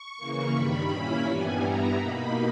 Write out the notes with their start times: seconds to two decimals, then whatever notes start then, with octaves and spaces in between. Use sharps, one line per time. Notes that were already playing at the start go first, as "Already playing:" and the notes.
Already playing: C#6
0.17 C#3 E3 A#3
0.53 G2 D#3 G3 B5
0.88 A#2 A#3 C#4 E4 B5
1.24 G2 E3 G3 B3 G#5
1.59 G2 G3 B3 E4 A#5
1.96 B2 A#3 D#4 B5